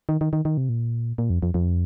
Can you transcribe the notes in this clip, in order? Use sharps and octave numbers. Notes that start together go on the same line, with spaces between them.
D#3
D#3
D#3
D#3
C3
A#2
A#2
F2
F2
F2